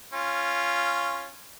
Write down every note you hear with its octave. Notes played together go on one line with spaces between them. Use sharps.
C#4 F4